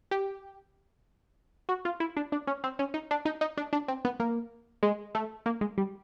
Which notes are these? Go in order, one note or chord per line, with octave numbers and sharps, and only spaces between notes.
G4
F#4
F4
E4
D4
D4
C#4
C4
C#4
D#4
D4
D#4
D#4
D4
D4
C4
B3
A#3
G#3
A3
A#3
G#3
G3